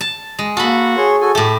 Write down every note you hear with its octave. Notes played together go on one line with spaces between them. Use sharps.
A5
G#3
A#3 F#4 A4 B5
G#4 C#5 C6 C#6
F#4 A4 G#5
A2 A3 G4 A5